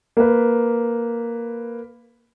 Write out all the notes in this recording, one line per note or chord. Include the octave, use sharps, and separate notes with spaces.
A#3 B4